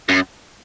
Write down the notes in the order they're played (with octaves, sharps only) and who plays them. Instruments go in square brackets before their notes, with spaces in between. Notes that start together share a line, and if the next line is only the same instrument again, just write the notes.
[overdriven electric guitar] F#2